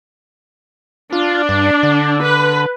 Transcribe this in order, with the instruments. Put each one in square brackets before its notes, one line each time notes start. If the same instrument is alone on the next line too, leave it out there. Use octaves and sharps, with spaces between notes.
[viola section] D4 [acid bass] F4
[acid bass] G2
D3
[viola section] B4